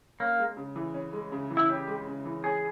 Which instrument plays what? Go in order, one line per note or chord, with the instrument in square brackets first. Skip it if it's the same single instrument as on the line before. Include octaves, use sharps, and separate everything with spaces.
[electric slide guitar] A#3 [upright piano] C#4
[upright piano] G#3
C#3
E3
C#4
G#3
C#3
E3
[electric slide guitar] E4
[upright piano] C#4 [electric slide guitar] G4
[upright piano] G#3
C#3
E3
[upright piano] C#4 [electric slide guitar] G#4